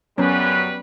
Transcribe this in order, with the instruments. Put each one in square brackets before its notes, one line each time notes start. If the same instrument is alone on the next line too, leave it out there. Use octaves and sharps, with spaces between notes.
[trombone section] F#2 [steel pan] F#3 B3 C#4 [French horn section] G3 B4